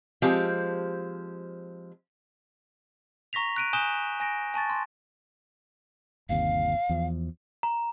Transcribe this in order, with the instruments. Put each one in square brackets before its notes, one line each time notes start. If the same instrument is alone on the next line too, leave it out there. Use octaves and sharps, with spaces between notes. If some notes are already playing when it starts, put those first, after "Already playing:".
[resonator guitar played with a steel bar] F3 G#3 C4 G4
[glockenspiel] A#5 C#6 A#6 B6 F7
F#6 D7 D#7
G#5 D#6 F#6 G6 E7 G7
G#5 A#6 D7
G#5 A5 C#6 A6
C6
[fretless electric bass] G1 D#2 C3 [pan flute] F5
[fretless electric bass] E2 F3
[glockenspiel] A#5